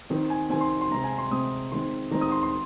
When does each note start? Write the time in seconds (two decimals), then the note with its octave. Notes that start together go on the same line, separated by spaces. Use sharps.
0.10 D#3 C4
0.30 G#5
0.50 D#3 C4 G#5
0.61 C6
0.81 C6
0.91 C3 G#3 C4 A#5
1.04 G#5
1.18 C6
1.31 C3 G#3 C4 D#6
1.72 D#3 G#3 C4 C6
2.11 D#3 G#3 C4 A#5
2.21 D#6
2.31 C6
2.43 C6